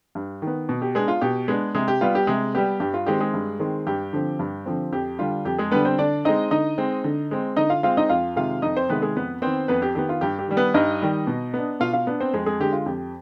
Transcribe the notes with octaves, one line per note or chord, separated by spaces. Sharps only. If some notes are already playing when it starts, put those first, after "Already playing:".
G2
D#3
B3
B2
G4
G#3 B3 D4 G#4
F4
B2 G4
G#3 B3 D4 G#4
C3 G#3 G#4
G4
G3 B3 F4
G4
C3 G#3 G#4
G3 B3 G4
G2 G4
F4
D#3 G#3 C4 G4
G#3 G#4
G2
D#3 G#3 C4
G2 G4
D3 F3 C4
G2
D3 F3 C4
F2 G4
D3 G3 D4 F4
F2 G4
G#3 G#4
D3 G3 B3 D4 B4
C4 C5
D3 D4 D5
G#3 C4 D#4 D#5
D3 D#4 D#5
G#3 C4
D3
G#3 C4
D3 D#4 D#5
F4 F5
G#3 C4 F4 F5
D#4 D#5
F2 F4 F5
C3 D#3 G#3 F4 F5
F2 D#4 D#5
C4 C5
C3 D#3 G#3 B3 B4
G#3 G#4
F2 B3 B4
D#3 B3 C4 C5
F2 B3 B4
G4
D#3 B3 G4
F4
G2 G4
G4
D#3 G3
B3 B4
G2 D#4 D#5
D#3 G3
B2
B3 D4
B2 F4 F5
F4 F5
B3 D4
C4 C5
F2 G#3 G#4
G#3 G#4
D3 G#3 G4
F4
F2 G4